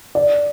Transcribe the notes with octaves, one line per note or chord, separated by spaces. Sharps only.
D5